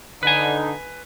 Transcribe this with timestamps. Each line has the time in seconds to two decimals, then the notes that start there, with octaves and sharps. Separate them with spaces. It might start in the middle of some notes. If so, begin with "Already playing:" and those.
0.23 D3 D#4 B4 G#5